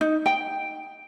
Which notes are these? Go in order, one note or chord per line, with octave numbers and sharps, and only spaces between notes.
D#4
G5